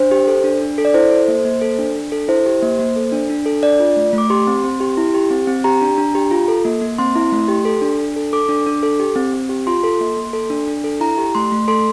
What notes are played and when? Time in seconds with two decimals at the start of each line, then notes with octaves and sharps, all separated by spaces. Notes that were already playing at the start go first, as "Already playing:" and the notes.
Already playing: D4 C5
0.11 G4
0.28 A4
0.44 D4
0.61 D4
0.78 A4
0.85 D5
0.94 E4 C5
1.11 A4
1.28 A#3
1.45 A#3
1.62 A4
1.79 D4
1.96 D4
2.12 A4
2.28 E4 C5
2.46 G4
2.62 A#3
2.79 A#3
2.96 A4
3.12 D4
3.30 D4
3.46 A4
3.63 D4 D5
3.80 F4
3.97 A3
4.13 A3
4.18 D6
4.30 G4 C6
4.47 C4
4.64 C4
4.81 G4
4.97 E4
5.14 G4
5.31 C4
5.47 C4
5.64 G4 A#5
5.81 D4
5.98 D4
6.15 G4
6.31 F4
6.48 A4
6.65 A#3
6.81 A#3
6.98 C4 C6
7.15 E4
7.32 A3
7.48 G4
7.65 A4
7.82 D4
7.99 D4
8.16 A4
8.33 A4 D6
8.49 D4
8.66 D4
8.83 A4
8.99 G4
9.16 C4
9.34 C4
9.49 G4
9.67 F4 C6
9.84 A4
10.01 A#3
10.17 A#3
10.33 A4
10.50 D4
10.67 D4
10.84 A4
11.00 E4 A#5
11.18 G4
11.35 A3 C6
11.52 A3
11.68 A4 C6